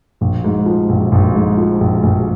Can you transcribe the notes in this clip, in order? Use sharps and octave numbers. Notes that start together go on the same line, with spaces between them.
A#1
G#2
F3
A#1
A#1
G#2
F3
A#1
A#1